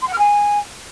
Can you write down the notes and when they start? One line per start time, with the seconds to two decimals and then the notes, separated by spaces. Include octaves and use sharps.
0.01 C6
0.07 F#5
0.13 F6
0.18 G#5